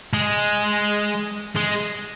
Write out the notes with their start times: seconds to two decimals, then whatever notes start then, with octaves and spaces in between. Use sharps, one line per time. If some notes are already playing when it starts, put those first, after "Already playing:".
0.13 G#3
1.56 G#3